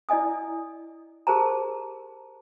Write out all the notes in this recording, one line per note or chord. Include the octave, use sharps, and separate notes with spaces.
E4 D5 D#5 G#5 D#6
G4 G#4 A#4 C5 A5 A#5